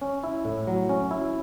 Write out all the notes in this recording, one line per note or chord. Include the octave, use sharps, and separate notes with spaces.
C#4
E4
A2
F#3
C#4
E4